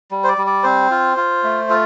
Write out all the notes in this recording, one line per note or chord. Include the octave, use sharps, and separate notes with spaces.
G3
C5
D5
G3
D5
C4 C5
F4
F4
A3
F4 A4